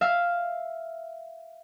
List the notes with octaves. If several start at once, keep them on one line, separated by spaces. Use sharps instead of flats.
E5 F5